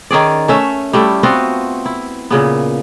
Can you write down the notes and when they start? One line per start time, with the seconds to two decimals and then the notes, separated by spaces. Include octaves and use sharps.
0.11 D#3 C#4 G#4 D5
0.48 A3 C#4 E5
0.93 G3 A3 E4
1.23 B3 C4 F4 F#4
1.86 E4
2.31 A#2 C#3 B3